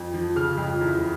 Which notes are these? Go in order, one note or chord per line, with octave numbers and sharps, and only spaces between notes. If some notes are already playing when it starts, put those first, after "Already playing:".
Already playing: F2
F3
C#3 F6
F2
E2